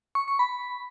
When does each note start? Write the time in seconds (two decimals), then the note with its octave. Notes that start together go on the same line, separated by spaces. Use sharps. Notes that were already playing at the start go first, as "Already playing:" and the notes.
0.15 C#6
0.28 C#6
0.39 B5